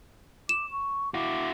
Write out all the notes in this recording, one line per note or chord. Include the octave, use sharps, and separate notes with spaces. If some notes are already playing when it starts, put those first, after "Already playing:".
D6 E7
C#6
E4 F#4 D6